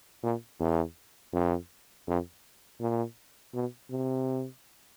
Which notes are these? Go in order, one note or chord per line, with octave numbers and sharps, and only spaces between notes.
A#2
E2
F2
F2
A#2
B2
C3